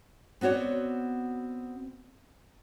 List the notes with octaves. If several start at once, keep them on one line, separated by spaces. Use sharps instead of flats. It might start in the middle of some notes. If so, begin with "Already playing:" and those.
B3 C4 F#4 C#5 D5